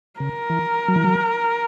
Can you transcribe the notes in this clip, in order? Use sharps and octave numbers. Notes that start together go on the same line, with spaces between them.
C#3 A#4
E3
F#3
E3
F#3